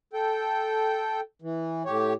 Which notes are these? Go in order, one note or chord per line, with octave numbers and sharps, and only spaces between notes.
A4 G5
E3
A2 G4 C#5